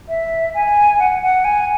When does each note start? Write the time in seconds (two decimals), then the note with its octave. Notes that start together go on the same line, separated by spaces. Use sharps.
0.09 E5
0.55 G#5
0.99 F#5
1.23 F#5
1.44 G#5